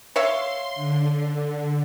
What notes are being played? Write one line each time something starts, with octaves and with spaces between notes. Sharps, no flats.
C#5 E5 F5 C6
D3